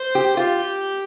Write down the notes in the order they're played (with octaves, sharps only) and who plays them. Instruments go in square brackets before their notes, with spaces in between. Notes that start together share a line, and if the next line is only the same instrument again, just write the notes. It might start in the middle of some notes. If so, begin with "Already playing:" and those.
Already playing: [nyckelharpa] C5
[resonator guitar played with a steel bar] G4
[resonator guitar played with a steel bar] F4 [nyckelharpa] G4